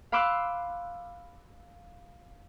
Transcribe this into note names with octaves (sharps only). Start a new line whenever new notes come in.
F5 B5 C6 D6 E6 F#6